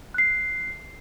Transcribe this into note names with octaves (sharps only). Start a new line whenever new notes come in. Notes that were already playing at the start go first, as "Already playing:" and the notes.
F#6 C7